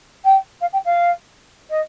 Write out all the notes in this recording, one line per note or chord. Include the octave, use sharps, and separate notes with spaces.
G5
F5
G5
F5
D#5